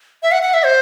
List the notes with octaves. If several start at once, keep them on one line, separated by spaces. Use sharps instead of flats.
E5
F#5
F#5
E5
C5